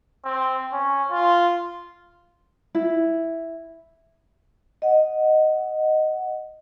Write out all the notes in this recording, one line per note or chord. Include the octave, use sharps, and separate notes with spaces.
C4
C#4
F4
E4
D#5 F#5